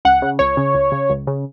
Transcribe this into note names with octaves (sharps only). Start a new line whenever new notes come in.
C#2 F#5
C#3
C#2 C#5
C#3
C#2
C#3
C#2
C#3